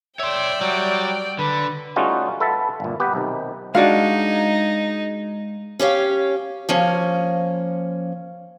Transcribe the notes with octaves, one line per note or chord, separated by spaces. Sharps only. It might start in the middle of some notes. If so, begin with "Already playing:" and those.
C#5 D5 E5 G5 C6
F#3 G3
D3 B4
G3 A3 C#4 D#4 F4 F#4
A4 B4 E5 F#5 A5
G1 A#2
B3 G4 B4
B1 C3 D#3
G#3 D4 D#4 F#4 F5
C#4 G4 C#5 F5
F3 A#3 C#4